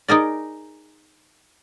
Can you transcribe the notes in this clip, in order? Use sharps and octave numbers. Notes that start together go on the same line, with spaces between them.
D#4 G#4 A#4 D5